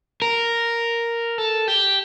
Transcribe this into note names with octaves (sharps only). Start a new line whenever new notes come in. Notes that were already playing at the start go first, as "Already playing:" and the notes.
A#4
A4
G4